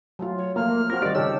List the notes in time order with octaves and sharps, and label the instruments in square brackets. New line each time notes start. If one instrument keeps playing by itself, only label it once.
[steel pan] F#3 A3 F4
[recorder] C#5
[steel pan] F3 A3 F4 [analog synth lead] A#3 [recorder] F6
[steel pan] C4 F4 F#4 [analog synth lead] A#4
[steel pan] D#3 G3 D#4 [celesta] G4 [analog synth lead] D5
[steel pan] C#3 G4 A4 [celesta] C#5 [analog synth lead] E6